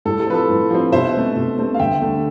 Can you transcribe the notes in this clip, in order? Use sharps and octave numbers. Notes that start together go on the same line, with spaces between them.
A2 A4
A4
F3 C4 B4
A4
A2
F3 C4
B2 C5 E5
A3 C4
B2
A3 C4
F5
D2 E5 G5
D3 A3